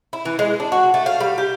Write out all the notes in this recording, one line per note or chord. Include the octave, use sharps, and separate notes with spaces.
E4
E3
G#3
D4
F#4
A3
F5
G3
G4